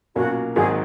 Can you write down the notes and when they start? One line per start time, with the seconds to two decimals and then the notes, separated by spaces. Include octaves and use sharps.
0.16 B1 A#2 F#3 A#3 C#4 F#4
0.55 G#1 G#2 D#3 F#3 G#4